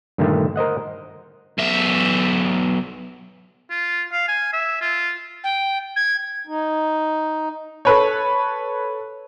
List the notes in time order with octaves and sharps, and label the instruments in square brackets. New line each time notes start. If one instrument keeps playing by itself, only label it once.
[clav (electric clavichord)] G2 A#2 D3 D#3 A3
A#4 C5 D#5 F#5
[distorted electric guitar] B1 E5
[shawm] F4
F5
G#5
E5
F4
[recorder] G5
G#6
[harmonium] D#4
[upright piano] A4 B4 C#5